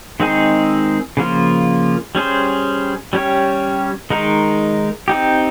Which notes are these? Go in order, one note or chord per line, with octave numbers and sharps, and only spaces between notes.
D#3 G#3 C4 D#4 G#4
C#3 F3 A#3 F4
G3 C#4 G#4 C5
G3 C#4 G4 C#5
D#3 G#3 D#4 A#4
C4 D#4 G4